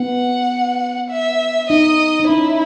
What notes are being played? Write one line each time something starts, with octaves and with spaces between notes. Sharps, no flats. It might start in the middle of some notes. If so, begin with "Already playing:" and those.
Already playing: B3 F#5
E5
D#4 D#5
D#4
C#4 E4